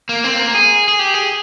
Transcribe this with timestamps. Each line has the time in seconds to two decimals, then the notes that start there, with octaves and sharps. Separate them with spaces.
0.09 A#3
0.24 C4
0.39 A#3
0.54 G#4
0.88 G#4
0.99 G4
1.14 G#4